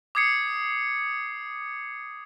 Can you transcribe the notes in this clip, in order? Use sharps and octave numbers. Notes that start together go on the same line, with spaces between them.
D6 D#6 G#6 C7 C#7